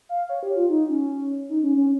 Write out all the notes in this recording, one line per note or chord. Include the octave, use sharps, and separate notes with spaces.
F5
C#5
G4
F4
D#4
C#4
D#4
C#4
C#4